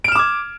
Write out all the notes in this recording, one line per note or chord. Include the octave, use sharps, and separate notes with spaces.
D6 F6 G#6 D7 E7